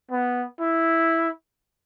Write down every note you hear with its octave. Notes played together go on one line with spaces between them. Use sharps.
B3
E4